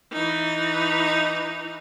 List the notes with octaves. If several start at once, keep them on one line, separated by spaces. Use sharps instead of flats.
E3 D#4